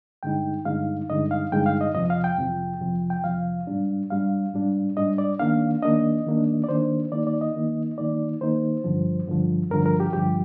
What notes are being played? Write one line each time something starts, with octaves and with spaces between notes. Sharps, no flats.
G2 D3 G#3 D#4 G5
G2 D3 G#3 D#4 F5
G2 D3 G#3 D#4 D#5
F5
G2 D3 G#3 D#4 G5
F5
D#5
F2 C3 F3 D#5
F5
G5
F2 C3 F3
F2 C3 F3
G5
F2 C3 F3 F5
G#2 G3 D4
G#2 G3 D4 F5
G#2 G3 D4
G#2 G3 D4 D#5
D5
D#3 A#3 D4 F5
D#3 A#3 D4 D#5
D#3 A#3 D4
D5
D#3 A#3 D4 C5
D#3 A#3 D#4 D5
D5
D#5
D#3 A#3 D#4
D#3 A#3 D#4 D5
D#3 A#3 D#4 C5
G2 D3 F3
G2 D3 F3
G2 D3 F3 A#4
A#4
G4
G2 D3 F3 G4